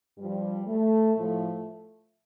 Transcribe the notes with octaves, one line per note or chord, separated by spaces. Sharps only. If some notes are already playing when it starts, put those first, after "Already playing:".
G2 F3 G3
A3
A2 F3 A3